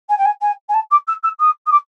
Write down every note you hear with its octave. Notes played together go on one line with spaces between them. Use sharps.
G#5
G5
G#5
G#5
G#5
A5
D6
E6
E6
D#6
D#6
D6